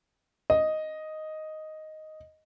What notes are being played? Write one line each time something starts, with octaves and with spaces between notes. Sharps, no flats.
D#5